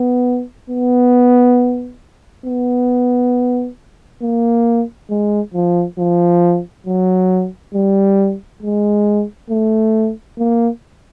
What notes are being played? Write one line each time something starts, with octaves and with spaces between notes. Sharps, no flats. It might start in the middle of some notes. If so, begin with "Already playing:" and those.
Already playing: B3
B3
B3
A#3
G#3
F3
F3
F#3
G3
G#3
A3
A#3